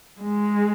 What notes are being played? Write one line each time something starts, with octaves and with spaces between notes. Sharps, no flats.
G#3